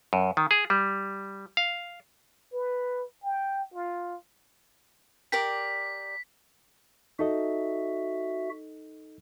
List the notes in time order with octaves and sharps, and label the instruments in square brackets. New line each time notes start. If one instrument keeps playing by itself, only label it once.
[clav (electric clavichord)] F#2
D#3
G#4
G3
F5
[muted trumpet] B4
G5
F4
[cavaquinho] G4 A#4 D5 [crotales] B6
[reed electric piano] D#4 A4 D#5 [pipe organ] F#4 E5